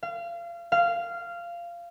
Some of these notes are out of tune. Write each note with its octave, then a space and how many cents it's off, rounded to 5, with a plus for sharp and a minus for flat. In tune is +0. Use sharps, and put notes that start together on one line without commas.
F5 -30
F5 -15